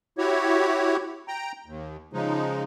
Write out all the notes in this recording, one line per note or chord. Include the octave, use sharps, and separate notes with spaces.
E4 F#4 G4 C#5
G5 A#5
D#2
C#3 F3 G#3 D#4